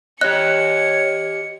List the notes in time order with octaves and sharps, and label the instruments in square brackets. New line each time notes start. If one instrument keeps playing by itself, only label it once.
[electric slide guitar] G4 D#5 [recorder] C#5 [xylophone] F#6 [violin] C#7